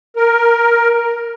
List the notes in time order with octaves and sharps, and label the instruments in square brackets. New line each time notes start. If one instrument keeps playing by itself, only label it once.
[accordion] A#4